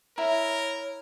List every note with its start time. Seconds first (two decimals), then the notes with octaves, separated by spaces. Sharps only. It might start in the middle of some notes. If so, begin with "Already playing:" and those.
0.18 E4 A#4 C#5 A#5